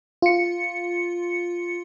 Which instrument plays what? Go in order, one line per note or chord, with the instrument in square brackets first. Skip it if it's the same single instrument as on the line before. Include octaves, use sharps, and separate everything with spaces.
[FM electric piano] F4 C#7